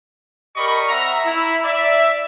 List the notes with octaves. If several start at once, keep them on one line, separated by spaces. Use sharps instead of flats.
G4 A#4 D5 D#5 B5 C#6
C4 E5 F#5 A#5
E4
D5 E5